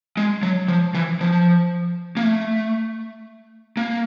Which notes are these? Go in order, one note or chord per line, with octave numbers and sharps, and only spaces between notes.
G#3
F#3
F3
E3
F3
A#3
A3
A#3